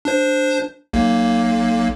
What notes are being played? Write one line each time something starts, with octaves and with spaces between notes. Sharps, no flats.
D4 C5
B1 A#3